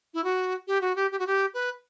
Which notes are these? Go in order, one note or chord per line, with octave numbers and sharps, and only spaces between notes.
E4
F#4
G4
F#4
G4
G4
F#4
G4
B4